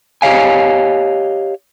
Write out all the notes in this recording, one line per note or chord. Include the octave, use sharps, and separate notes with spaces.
G4 C#5 D#5 F5 G#5